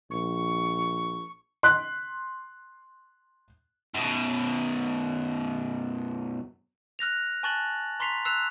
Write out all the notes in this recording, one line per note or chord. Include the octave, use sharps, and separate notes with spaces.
A#1 C#6
C6 F#6 B6
F#2 B2
F6 F#6 A#6 F7
G#5 A5 C#6 F#6 A6 F#7
A#5 C6 C#6 B6 C7 F7
E6 F#6 C7 E7 F7